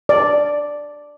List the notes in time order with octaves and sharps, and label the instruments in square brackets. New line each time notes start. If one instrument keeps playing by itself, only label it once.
[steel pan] D5